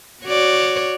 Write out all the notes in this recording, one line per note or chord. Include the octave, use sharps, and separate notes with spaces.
F#4 C#5 D5